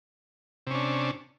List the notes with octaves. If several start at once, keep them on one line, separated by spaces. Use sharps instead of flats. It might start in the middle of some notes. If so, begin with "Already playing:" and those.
C3 C#4 D4